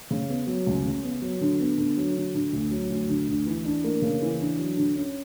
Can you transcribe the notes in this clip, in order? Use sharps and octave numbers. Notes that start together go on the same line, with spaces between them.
C#3
B3
F#3
C#2
C#3
B3
F#3
D3
B3
D3
F#3
D3
D3
D2
F#3
D2
D3
D2
E3
D4
A#3
C#3
E3
D4
F#3
D3
C#4